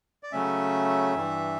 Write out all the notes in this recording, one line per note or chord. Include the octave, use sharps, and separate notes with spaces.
D5
C#3 F#3 A3 C#4 E5
G2 E3 G3